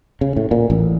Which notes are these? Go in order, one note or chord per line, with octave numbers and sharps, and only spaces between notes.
C#3
A2
A#2
A1